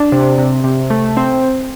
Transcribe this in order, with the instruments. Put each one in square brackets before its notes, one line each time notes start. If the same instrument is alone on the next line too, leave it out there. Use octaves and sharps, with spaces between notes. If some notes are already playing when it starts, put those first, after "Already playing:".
Already playing: [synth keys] D4
C3
C3
C3
A3
C4